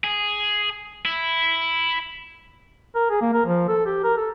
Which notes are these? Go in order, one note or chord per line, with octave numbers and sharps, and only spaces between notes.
G#4
E4
A#4
G#4
A#3
A#4
F3
A4
G4
A#4
A4